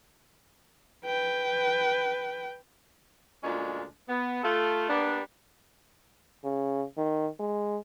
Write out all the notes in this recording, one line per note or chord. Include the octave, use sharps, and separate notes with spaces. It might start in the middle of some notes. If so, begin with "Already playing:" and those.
B4 G5
D2 A#2 G#3 C#4 D4 F4
B3
A3 F4 A4
G3 A#3 B3 D4
C#3
D#3
G#3